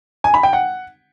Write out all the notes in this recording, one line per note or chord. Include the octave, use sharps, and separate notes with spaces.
G#5
B5
G5
F#5